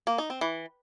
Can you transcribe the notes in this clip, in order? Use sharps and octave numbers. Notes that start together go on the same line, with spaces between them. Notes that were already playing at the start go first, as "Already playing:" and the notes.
A#3
D#4
C4
E3